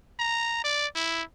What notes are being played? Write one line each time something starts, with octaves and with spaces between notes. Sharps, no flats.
A#5
D5
E4